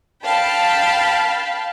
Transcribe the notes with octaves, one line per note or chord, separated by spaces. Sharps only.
F5 G5 A5 B5